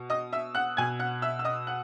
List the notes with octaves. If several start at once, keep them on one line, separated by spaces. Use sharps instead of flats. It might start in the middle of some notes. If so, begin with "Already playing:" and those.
Already playing: B2
D#5 D#6
E5 E6
F#5 F#6
B2 G#5 G#6
F#5 F#6
E5 E6
E6
D#5 D#6
F#5 F#6